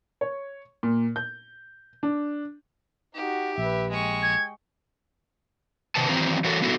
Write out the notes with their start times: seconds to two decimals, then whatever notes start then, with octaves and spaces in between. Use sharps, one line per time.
0.21 C#5
0.83 A#2
1.16 G6
2.03 D4
3.15 D#4 F#4 G4
3.58 A#1 B4 E5
3.90 G#3 G5 C#6
4.23 G#6
5.95 C3 D#3 B4 A5
6.09 D#3 E3 F#3 C4 A#5
6.44 E3 F#4 A4 A#4 C#5
6.62 B3 D#4 E4 F#4 A4